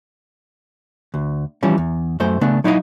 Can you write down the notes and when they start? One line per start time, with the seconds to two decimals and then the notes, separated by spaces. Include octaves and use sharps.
1.14 D2
1.63 E3 F3 G3 C#4
1.78 E2
2.20 F#2 A3 C5
2.41 C#3 A3 B3 D4
2.64 F#3 D#4 E4 C#5 D#5 F5